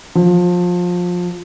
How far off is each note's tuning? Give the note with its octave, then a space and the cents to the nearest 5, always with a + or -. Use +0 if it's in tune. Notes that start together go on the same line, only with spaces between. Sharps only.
F3 +25